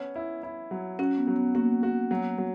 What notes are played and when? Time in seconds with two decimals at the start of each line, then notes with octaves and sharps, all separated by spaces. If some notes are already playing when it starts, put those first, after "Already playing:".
Already playing: B3 C#4
0.16 E4
0.43 E4
0.71 F#3
0.99 C#4 F#4
1.17 B3
1.27 F#3
1.36 B3
1.55 A#3 F#4
1.83 F#4
2.11 F#3
2.38 F#3